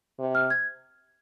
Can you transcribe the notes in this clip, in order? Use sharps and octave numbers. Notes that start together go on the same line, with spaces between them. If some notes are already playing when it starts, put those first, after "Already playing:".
C3
F6
G#6